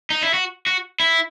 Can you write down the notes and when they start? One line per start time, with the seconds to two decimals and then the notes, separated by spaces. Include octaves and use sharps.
0.10 D#4
0.23 E4
0.34 F#4
0.67 F#4
1.00 E4